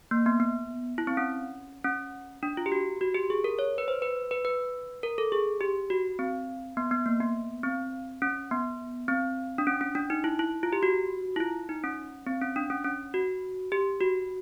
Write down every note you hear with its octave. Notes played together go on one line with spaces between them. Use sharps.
A#3
B3
B3
E4
C4
C#4
C#4
D4
F4
G4
F#4
F#4
G4
G#4
A#4
C#5
B4
C5
B4
B4
B4
A#4
A4
G#4
G4
F#4
C4
B3
B3
A#3
B3
C4
C#4
B3
C4
D4
C#4
C#4
D4
D#4
E4
E4
F4
G4
F#4
E4
F4
D#4
C#4
C4
C#4
D4
C#4
C#4
F#4
G4
F#4